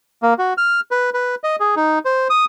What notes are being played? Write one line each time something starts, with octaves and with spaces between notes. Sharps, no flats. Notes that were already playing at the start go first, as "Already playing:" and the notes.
A#3
F#4
F6
B4
B4
D#5
G#4
D#4
C5
D#6